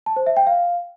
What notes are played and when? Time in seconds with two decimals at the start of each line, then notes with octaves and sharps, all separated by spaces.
0.06 A5
0.16 C5
0.27 E5
0.37 G5
0.47 F5